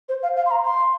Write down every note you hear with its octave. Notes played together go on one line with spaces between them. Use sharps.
C5
F5
F5
C6
A#5
C6